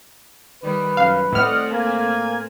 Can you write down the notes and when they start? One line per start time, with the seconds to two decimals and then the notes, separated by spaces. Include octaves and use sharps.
0.63 D#3 G3 B4
0.97 F#2 F5
1.33 A2 A3 C4 D5 D#5 F#5 F6
1.71 A#3 G#5